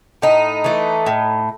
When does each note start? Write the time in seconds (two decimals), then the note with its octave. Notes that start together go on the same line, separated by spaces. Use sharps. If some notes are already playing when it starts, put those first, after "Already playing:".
0.22 A2 D#4
0.64 E3 A3
1.06 A2